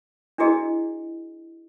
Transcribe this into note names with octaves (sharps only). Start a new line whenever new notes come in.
D4 E4 F#4 G#4 D#5